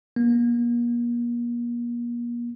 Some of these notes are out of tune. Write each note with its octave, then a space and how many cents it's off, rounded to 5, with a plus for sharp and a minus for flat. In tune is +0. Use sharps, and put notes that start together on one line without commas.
A#3 +40